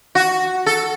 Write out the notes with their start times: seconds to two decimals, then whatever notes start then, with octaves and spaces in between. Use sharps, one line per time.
0.15 F#4
0.66 A4